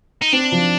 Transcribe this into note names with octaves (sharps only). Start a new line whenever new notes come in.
D#4
C4 D4
F3